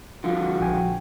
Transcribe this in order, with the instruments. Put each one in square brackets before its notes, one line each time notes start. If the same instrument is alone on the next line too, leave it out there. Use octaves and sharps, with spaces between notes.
[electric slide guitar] D3 F3 [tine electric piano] F4 [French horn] F#4
[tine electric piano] A#1 G5 G#5